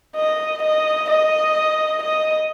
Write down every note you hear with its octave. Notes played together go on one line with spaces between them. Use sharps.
D#5
D#5
D#5
D#5